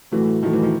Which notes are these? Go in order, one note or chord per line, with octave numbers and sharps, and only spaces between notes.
A2 E3 F#3 A3
A2 D#3 F3 F#3 A3
E3
D#3